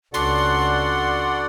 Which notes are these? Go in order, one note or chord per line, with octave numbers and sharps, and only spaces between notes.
C#2 D4 F#4 A4 D5 F#5 C6